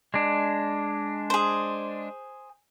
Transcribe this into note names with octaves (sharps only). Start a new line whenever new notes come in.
G#3 D4
G#4 C5